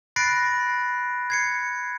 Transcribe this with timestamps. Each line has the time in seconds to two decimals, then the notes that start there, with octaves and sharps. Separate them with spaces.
0.16 B5 F#6 A6 A#6 C7 D7
1.30 G#6 C7 C#7